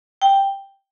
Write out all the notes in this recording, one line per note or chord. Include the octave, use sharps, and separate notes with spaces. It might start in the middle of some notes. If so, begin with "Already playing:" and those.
G5